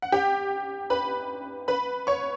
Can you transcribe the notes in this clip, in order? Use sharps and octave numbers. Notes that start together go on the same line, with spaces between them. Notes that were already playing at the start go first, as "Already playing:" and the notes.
F#5
G4 G5
B4 B5
B4 B5
C#5 C#6